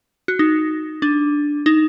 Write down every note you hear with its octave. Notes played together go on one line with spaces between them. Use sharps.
F#4
D#4
D4
D#4